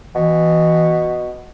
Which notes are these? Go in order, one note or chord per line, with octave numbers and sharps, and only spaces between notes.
B2 E3